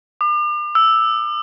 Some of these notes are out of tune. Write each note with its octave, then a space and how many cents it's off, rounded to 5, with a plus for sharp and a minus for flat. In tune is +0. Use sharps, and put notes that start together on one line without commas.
D6 +40
E6 +0